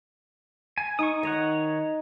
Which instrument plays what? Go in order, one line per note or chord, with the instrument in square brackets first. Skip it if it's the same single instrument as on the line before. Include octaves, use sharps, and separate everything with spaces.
[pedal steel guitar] G#5
[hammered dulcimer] D#4 [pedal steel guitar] C#6 D#6
[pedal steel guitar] D#3 C#5 F#5 [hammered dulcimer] D#5